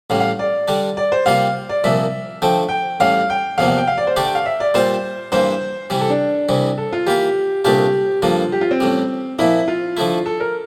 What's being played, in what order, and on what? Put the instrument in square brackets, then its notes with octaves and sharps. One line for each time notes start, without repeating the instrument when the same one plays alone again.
[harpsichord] A1 A2 G3 [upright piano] F5
[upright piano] F5
D5
[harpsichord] D3 G3 D4
[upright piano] D5
C5
[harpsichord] C3 G3 A#3 F4 [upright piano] F5
[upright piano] D5
[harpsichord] C2 A#2 F3 A#3 [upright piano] E5
[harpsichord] D3 F3 A3 C4 [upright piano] G5
[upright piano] G5
[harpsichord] A1 A2 G3 [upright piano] F5
[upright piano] G5
[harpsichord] E2 C3 F3 A#3 [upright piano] F5
[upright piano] F5
G5
F5
D5
C5
[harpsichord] D3 A3 D4 G4 D5
[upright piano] G5
F5
E5
D5
[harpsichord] A#2 G3 C4 F4 [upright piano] C5
[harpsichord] G2 E3 A#3 [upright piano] C5
[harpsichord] C3 E3 G3
[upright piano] A4
D4
[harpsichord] C2 C3 E3
[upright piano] A4
F4
[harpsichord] E3 A#3 F4 [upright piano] G4
[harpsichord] C2 A#2 A3 D4 F4 [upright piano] G4
[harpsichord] G2 D3 F3 A#3 [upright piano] F4
[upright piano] G4
F4
C4
[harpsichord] A1 A2 G3
[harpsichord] A#2 F3 A#3 [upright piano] E4
[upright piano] F4
[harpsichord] D3 F3 A3 E4
[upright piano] A4
A#4